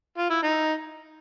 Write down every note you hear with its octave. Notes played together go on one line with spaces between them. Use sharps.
F4
E4
D#4